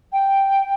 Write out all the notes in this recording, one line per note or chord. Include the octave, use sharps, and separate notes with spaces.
G5